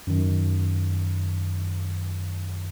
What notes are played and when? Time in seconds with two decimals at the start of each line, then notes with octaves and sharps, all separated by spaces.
0.07 F#2 D#3